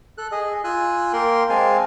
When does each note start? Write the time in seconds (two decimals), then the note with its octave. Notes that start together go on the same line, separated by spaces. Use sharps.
0.18 A4 F#6
0.32 G#4 D#5
0.64 F4 G#5 E6 F#6
1.13 A#3 A#4 G5 C6
1.49 G#3 C4 F5 G#5 A5